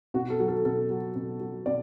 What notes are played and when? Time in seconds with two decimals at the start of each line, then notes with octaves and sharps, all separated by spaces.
0.14 B2 F#4
0.30 A4
0.40 F#3
0.48 A4
0.65 B2 A4
0.90 F#3
1.16 B2
1.40 F#3
1.66 B2 D5